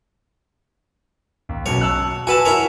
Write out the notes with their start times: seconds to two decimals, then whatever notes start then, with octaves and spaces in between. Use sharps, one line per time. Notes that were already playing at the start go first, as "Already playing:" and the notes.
1.49 D#2
1.66 B1 F#2 B2 C#5
1.81 A5 E6 F#6
2.27 F#4 B4 G#5 A5 E6
2.45 E4 A#4 C#5